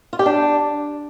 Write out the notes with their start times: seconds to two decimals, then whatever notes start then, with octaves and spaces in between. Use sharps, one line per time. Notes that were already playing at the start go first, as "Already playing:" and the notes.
0.13 F4
0.19 G4
0.26 D4